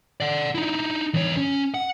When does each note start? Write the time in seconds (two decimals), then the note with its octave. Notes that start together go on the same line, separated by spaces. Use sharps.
0.20 D5 F#5
0.55 D#4 E4
1.14 E2 C#5
1.37 C#4
1.74 F#5